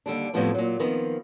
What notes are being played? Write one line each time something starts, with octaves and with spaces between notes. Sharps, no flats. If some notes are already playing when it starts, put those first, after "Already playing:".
D#2 D3 G3 D4
F2 A2 F3 G3 B3 D4
A#2 F#3
D#3 F3 B3 C4